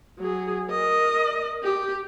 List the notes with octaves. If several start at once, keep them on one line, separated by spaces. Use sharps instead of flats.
F#3 G#4
A#4 D#5
G4